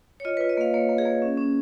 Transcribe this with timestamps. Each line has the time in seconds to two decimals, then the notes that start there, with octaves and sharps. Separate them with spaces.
0.20 C#5
0.25 F4 D#5
0.37 F4 B4
0.49 D#5
0.57 A#3 F5
0.74 A#3 C#5
0.89 A#3
0.98 G#4
1.05 A#3
1.22 C#4
1.38 C#4